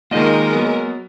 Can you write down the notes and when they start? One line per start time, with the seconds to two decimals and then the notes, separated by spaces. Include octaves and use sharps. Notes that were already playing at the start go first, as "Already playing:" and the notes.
0.11 D#3 G#3 A#3 D#4 F4 A#4 D#5
0.52 F#3 B3